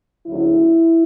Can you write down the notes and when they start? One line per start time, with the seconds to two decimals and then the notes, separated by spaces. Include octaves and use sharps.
0.25 D2 C#3 F#3 E4